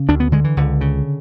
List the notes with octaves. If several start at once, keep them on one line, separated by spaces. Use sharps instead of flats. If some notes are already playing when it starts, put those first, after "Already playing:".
Already playing: C#3
D2 D4
B3
D3 G#3
E3
C#2 D3
C#3